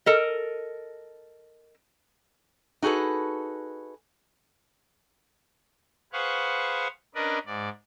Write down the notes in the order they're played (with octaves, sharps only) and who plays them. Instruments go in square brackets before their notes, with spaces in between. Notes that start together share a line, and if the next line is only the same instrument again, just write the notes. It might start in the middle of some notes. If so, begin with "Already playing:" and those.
[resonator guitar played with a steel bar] A4 A#4 D#5
D#4 F#4 G#4 A4 B4
[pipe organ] G#4 B4 C5 F5 F#5 C#6
C#4 D4 A#4 B4 D5 D#5
G#2 D5